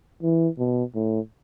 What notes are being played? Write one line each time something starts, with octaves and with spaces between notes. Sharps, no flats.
E3
B2
A2